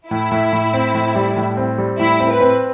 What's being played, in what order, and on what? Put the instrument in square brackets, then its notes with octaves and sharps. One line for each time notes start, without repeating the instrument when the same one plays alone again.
[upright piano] A2 [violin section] E4
[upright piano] A2
A2
C4
A2
G3
A2
C4
G3
[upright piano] A2 [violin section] E4
[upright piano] C4
[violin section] B4
[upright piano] C4